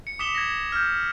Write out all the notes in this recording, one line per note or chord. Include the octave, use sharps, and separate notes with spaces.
C#7
D6 D#6 B6 C#7 E7 G7
G#6 A#6
F6 G6